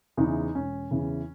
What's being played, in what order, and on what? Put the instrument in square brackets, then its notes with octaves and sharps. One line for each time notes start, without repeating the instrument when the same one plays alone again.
[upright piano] E2 C#3 E3 D#4
E1 C#4
E2 C#3 E3